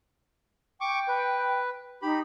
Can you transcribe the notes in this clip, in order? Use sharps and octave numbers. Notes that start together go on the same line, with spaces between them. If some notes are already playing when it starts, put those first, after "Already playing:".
G5 C#6 D6
B4
D#4 G4 B5